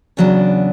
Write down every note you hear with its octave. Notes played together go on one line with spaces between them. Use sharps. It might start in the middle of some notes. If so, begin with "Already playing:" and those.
E2 C#3 F#3 B3 D4